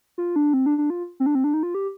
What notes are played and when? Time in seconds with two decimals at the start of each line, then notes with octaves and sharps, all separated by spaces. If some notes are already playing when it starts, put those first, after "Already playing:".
0.18 F4
0.36 D4
0.53 C4
0.66 D4
0.78 D4
0.90 F4
1.20 C4
1.26 D4
1.35 C4
1.44 D4
1.54 D#4
1.63 F4
1.75 G4